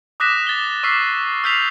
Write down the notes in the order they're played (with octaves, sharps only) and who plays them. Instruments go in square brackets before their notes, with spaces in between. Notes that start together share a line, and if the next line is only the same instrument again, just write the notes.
[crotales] D6 D#6 F#6 A#6 B6 E7
A6 G7
C#6 D6 E6 F6 B6 C7
E6 F6 G6 B6 C7 F7